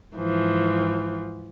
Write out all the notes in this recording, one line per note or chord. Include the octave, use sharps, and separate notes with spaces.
G#2 E3 F3